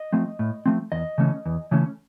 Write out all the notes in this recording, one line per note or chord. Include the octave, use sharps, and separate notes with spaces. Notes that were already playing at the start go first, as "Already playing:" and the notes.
Already playing: D#5
F3 A3 C4
A2
F3 A3 C4
E2 D#5
C#3 E3 A3 C#4
E2
C#3 E3 A3 C#4